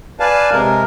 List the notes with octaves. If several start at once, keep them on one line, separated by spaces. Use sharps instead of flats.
B4 D5 F5 G#5 A5
C3 G#3 A#4